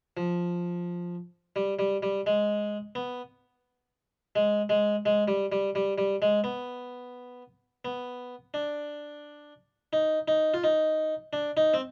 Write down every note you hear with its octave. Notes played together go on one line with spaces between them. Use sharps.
F3
G3
G3
G3
G#3
B3
G#3
G#3
G#3
G3
G3
G3
G3
G#3
B3
B3
D4
D#4
D#4
F4
D#4
D4
D#4
C4